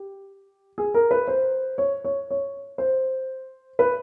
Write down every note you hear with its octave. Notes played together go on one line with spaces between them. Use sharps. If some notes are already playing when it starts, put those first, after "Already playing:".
Already playing: G4
G#4
A#4
B4
C5
C#5
C#5
C#5
C5
B4